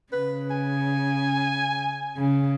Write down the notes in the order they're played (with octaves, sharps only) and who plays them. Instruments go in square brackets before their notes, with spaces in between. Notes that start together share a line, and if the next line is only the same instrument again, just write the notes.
[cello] C#3 [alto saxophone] B4
[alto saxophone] G#5
[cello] C#3